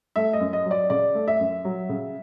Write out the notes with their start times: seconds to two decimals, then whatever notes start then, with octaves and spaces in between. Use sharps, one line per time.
0.16 A3 E5
0.33 D#5
0.40 F#2
0.53 D#5
0.65 F#3
0.71 D5
0.90 C#3 D5
1.15 A3
1.28 E5
1.39 F#2
1.65 F#3
1.89 C#3